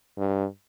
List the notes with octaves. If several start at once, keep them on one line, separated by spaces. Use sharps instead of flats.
G2